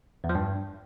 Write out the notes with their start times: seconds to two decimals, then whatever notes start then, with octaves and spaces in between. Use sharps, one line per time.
0.24 E2
0.29 F3
0.35 G2